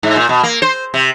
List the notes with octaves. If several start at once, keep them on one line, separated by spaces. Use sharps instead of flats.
G#2
A#2
B2
A#3
C5
C3